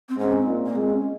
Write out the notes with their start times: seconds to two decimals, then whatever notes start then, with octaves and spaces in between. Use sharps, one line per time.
0.09 C4
0.18 G#2 C#4
0.33 C4
0.47 A#2
0.66 A#3
0.75 G#3 C4
0.90 C#4